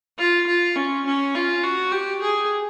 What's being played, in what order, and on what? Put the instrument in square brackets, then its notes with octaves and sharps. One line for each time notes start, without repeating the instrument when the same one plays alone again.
[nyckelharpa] F4
F4
C#4
C#4
F4
F#4
G4
G#4